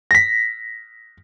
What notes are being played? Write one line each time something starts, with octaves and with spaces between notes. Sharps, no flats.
A#6 B6